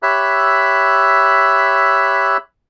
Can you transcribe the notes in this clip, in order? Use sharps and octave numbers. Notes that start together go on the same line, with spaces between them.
G4 C#5 E5 B5 E6 F#6